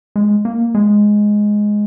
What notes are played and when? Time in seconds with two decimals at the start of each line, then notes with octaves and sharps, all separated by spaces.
0.16 G#3
0.45 A#3
0.75 G#3